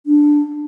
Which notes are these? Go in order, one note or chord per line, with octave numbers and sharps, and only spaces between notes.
D4